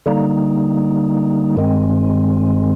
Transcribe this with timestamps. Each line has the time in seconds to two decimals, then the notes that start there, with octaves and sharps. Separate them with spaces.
0.06 D3 G3 A#3 D#4
1.57 G2 D#3 G#3 C4